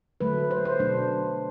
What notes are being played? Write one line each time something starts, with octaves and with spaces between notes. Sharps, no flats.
D3 F#3 A3 B4
C5
C5
B2 F#3 A3 D4